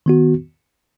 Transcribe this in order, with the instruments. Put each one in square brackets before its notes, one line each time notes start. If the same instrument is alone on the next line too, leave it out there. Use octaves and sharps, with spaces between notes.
[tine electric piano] D#3 B3 F#4